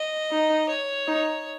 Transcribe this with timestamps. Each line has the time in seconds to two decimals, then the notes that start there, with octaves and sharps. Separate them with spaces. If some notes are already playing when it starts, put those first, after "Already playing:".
Already playing: D#5
0.31 D#4
0.69 C#5
1.08 D#4